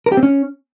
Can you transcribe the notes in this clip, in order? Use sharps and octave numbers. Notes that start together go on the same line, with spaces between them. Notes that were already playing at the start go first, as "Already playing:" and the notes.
A#4
G4
C4
C#4